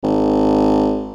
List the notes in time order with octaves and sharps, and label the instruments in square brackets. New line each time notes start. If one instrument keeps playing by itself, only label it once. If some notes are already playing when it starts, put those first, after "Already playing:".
[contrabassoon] G#1